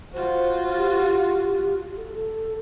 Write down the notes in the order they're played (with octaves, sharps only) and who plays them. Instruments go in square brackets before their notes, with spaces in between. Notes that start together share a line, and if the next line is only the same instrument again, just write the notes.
[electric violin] F4 F#4 [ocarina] C5
[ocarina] G4
A4